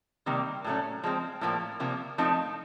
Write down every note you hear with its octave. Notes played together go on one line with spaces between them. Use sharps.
C3 D#3 G3 A#3
A2 F#3 A3 C#4
F3 G#3 C4
A2 F3 A#3
C3 F3 A#3
F3 A3 C4 D#4